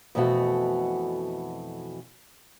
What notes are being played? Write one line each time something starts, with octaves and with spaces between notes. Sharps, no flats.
F2 B2 E3 A3 F#4